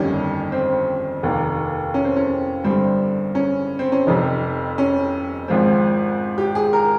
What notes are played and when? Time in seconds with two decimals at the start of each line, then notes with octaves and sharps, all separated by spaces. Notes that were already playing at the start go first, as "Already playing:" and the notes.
Already playing: G1 F2 D#3 G3 C#4
0.52 C4
1.23 F1 D#2 D#3 A#3
1.94 C#4
2.05 C4
2.16 C#4
2.64 G1 G2 G3 C4
3.35 C#4
3.79 C4
3.92 C#4
4.07 F1 F2 C3 D#4
4.78 C#4
5.48 G#1 G#2 F3 C4
6.38 G4
6.55 G#4
6.73 A#4